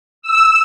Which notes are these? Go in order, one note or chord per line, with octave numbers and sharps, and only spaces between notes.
E6